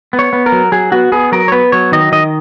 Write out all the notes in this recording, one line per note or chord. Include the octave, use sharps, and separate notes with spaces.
B3
C#5
B3
A#4
F#3
F#3 G#4
B3 F#4
B3 G#4
F#3 A#4
C#5
B3 B4
F#3 C#5
D#3 D#5
D#3 D#5